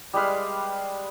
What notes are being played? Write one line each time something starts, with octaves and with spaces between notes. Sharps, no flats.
G3 G#3 B4 F5